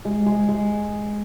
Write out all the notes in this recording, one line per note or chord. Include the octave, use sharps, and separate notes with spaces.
G#3
G#3
G#3